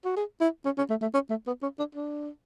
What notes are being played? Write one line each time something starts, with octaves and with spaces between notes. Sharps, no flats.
F#4
G#4
E4
C#4
C#4
A3
A3
C#4
A3
B3
C#4
D4
D4